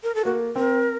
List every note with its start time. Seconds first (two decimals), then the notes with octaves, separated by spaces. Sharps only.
0.03 A#4
0.15 A4
0.25 A#3 F#4
0.56 C4 A#4